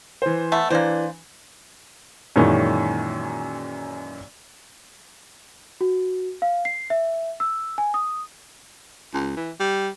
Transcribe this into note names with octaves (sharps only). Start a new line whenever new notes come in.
E3 C5
A3 B3
E3 A#3 D4 C5
F#2 A#2 D#3 E3 G#3 C#4
F#4
F5
C7
E5
E6
G#5
D#6
C#2
E3
G3